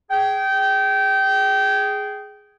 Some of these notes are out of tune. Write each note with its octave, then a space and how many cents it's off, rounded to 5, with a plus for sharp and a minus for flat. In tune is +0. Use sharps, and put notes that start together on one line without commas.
G#4 +0 G5 -20